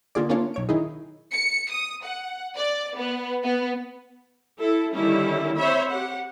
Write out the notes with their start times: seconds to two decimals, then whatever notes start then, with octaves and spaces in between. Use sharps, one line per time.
0.15 D3 A#3 F4 G#4 D5
0.29 A3 A#3 C#4 D4 F4 C#5
0.54 B1 C#5 D7
0.69 D#3 D#4 E4 G#4
1.32 C#7
1.70 D#6
2.04 F#5
2.56 D5
2.98 B3
3.43 B3
4.61 E4 A4
4.95 D3 D#3 G3 C#4 E4
5.57 C4 C5 C#5 E5 B5
5.91 G4 F#5